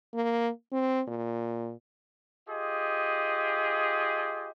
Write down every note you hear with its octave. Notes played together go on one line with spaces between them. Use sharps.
A#3
C4
A#2
F4 G4 G#4 D#5